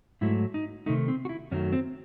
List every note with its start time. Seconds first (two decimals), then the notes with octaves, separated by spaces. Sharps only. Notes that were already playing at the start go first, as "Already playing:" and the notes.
0.21 G#2 F#3 A3 E4
0.54 D#4
0.86 C3 D#3 A3 D#4
1.08 C4
1.25 F#4
1.29 E4
1.51 F#2 D#3 F#3 A3 C#4
1.72 C4